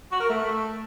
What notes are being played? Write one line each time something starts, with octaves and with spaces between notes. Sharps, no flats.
F#4
A#4
A3